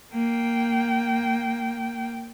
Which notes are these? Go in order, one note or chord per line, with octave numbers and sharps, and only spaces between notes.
A#3 G5